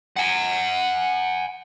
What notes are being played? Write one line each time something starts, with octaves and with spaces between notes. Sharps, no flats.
F#5 G#5